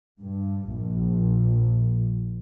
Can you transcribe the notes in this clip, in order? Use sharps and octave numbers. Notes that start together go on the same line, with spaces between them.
G2
A#1